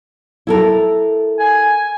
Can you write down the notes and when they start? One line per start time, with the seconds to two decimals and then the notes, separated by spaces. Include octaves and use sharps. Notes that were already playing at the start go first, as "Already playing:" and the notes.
0.47 E4 A4 A#4
1.40 G#5